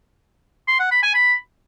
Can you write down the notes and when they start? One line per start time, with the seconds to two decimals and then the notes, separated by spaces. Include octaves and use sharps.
0.68 C6
0.79 F#5
0.91 B5
1.03 G#5
1.15 B5